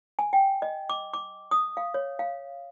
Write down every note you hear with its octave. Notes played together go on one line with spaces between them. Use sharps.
G#5
G5
D#5
D6
D6
D#6
F5
C#5
F5